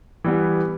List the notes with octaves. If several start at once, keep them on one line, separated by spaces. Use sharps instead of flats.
E3 G3 B3